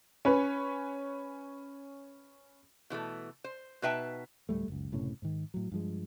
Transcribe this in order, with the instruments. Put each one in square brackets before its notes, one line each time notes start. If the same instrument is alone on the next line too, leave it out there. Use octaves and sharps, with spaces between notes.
[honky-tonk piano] C#4 B4
[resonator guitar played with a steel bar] B2 E3 G#3 A3
C5
B2 D#4 B4 E5 G5 A5
[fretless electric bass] D1 G1 G3 A3
F#1 C#2
F#1 A2 C3 C#4
G#2 D#3
A2 F#3
G2 F3 G#3